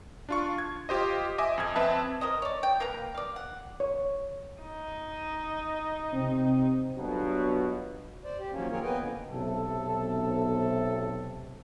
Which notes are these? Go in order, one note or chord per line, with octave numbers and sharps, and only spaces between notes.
D4 F4 C#6
G#6
F4 G4 C5 D#5
D#5 E5 G#5 D6 D#6
F2 G#6
C4 B4 E5 A5
A#4 C5 D#5
C#5 D5
G5
A#3 A#4 B4 A#5
D5 F5
F#5
C#5
D#4
C3 C4
G1 B2 F#3
C5 D5
G4
D#3 F3 F#3 A#3 C#4
C4 C#4 F4 G#4 A#4 C#5
A#3 B3 B4 D#5 G5 G#5
A#2 D3
B1 C3 A4